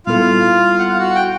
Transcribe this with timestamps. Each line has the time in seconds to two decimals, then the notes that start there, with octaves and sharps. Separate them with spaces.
0.06 A#2 G3 B3 E4 F4 A4 F5
0.79 F#5
0.88 F5
0.98 F#4 F#5
1.15 G5